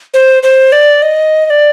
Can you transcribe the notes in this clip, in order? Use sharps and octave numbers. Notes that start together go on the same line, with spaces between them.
C5
C5
D5
D#5
D#5
D5